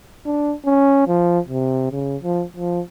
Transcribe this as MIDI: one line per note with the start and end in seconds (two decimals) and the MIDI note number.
0.26 0.54 62
0.66 1.05 61
1.08 1.40 53
1.48 1.90 48
1.91 2.16 49
2.23 2.44 53
2.56 2.81 53